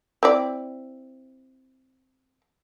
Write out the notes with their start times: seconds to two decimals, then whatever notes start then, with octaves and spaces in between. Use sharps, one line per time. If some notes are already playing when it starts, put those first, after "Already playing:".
0.23 C4 E4 D5